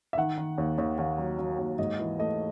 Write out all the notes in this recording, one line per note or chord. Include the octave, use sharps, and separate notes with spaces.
E5
D#3 F#5
D#3
D#2
D#2
D#2
F#3
F#3
D#2
G#2 D#5
E3
A3 D#5